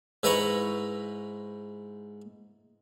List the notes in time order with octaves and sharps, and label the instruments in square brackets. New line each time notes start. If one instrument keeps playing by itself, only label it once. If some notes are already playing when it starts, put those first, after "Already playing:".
[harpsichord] G#2 E4 B4 A#5 B5 C#6